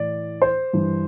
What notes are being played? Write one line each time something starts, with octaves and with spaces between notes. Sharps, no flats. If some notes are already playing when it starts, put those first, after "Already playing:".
Already playing: A2 E3 D5
C5
G2 E3